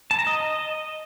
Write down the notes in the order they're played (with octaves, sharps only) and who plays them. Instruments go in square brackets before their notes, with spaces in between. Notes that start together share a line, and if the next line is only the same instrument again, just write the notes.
[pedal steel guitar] A5
A#5
D#5